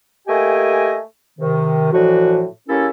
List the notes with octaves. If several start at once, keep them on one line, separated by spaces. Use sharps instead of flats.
A3 A#3 G4 D#5 G5 G#5
C3 D#3
A2 D3 E3 F3 F#4
C#3 A#3 C#4 E4 G4 A4